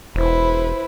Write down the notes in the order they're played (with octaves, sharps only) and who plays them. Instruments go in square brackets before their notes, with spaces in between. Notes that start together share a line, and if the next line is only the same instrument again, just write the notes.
[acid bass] E1 [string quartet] E4 B4 C5